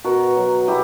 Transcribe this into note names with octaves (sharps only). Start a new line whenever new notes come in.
B2 F#4 A#4
F#3
B2 E4 G4